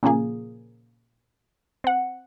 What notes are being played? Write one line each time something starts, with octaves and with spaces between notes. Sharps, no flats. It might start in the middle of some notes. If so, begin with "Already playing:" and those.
A#2 C#3 F3 A#3 G#4
C4 F#5